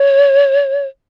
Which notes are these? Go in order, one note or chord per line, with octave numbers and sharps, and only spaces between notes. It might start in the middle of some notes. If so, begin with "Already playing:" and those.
Already playing: C#5